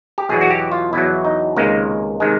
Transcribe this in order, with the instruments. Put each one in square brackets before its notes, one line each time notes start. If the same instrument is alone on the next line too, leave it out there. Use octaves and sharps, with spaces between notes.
[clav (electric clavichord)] G4
E2 B2 F#3 G#4
F#4
G4
F4
E2 B2 F#3 E4
D#4
C#2 C3 D#3 G#3 A#3
C3 D#3 G#3